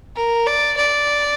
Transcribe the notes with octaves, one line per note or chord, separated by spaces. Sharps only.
A#4
D5
D5